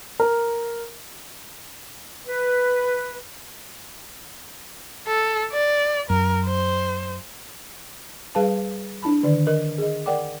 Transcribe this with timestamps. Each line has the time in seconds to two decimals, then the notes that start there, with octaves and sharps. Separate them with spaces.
0.20 A#4
2.26 B4
5.07 A4
5.52 D5
6.10 F#2 A#4
6.46 C5
8.35 G3 G#4 B4 F5 A5
9.03 D4 E4 A5 B5
9.23 D3 D#3 D5
9.47 A#4 D#5
9.78 G#4 D#5
10.06 A#4 D5 F#5 G5 D6